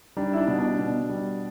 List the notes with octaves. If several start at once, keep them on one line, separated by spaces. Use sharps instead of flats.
G3 D4
E4
D4
B2
D4
B2
G3